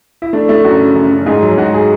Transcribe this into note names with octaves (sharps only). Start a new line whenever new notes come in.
E4
A3 D4
A3 E4
F#2 F#4
C#3
F#2
F#2
G#2 G#4
F#3
G#2 F#4
G#4